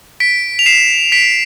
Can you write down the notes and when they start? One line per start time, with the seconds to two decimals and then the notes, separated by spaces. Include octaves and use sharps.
0.20 B6 D7
0.59 F7
0.66 C7 E7
1.12 B6 D7